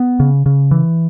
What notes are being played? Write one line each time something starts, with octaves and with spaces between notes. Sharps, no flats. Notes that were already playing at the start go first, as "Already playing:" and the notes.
Already playing: B3
C#3
C#3
E3